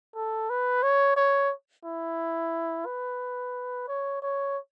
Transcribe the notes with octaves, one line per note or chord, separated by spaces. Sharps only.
A4
B4
C#5
C#5
E4
B4
C#5
C#5